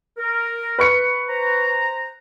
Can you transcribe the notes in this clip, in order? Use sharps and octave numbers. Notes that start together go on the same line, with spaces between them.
A#4
B4 C#6 C#7
C5 A#5